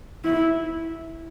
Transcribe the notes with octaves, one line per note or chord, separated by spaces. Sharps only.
E4